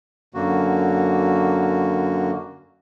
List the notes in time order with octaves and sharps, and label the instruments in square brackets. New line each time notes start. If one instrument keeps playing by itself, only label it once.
[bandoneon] F#2 D3 A#3 F#4